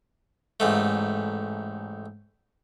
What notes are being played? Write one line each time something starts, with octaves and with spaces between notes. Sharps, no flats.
A1 G#2 A3